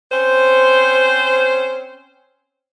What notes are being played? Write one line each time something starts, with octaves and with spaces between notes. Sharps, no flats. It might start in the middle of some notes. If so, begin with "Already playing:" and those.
C4 C#4 C5